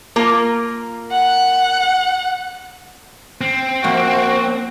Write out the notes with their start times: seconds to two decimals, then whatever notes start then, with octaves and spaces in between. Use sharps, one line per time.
0.16 A#3 F4 A#4
1.12 F#5
3.41 C4
3.84 F3 A#3 F#4 E5